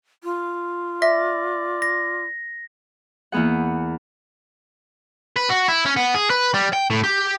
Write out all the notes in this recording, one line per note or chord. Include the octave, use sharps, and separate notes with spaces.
F4
D5 E5 A#6
A#6
E2 A#3 B3 G#4 F#5
B4
F#4
E4
C#4
B3
G#4
B4
G3
G5
A2
G4